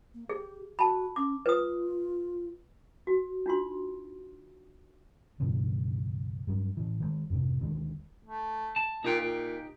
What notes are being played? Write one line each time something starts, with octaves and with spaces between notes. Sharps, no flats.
A#3
G4 G#4
F#4 A5 B5
C#4 D6
F4 B4 D#6
F#4
D4 D#4 F4 F#4 C6
C#2 G2 B2 E3
G2 F#3
A2 E3
D#3 F#3 G#3
F2 G#2 C3
D2 D#3 G#3
A3
A5
A#2 D#4 G4 G5
A#2